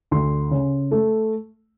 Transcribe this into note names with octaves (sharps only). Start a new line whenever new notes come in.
D2 C6
C#3
A3